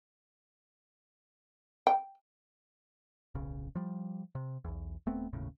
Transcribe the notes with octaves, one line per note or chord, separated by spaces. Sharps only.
G5
D1 B1 C#3
F3 G3
C3
B1 E2
D#1 A3 B3 C4
G1 D#2 A2 C#3